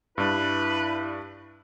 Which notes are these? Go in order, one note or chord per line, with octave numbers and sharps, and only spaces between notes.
G2 D4 E4 B4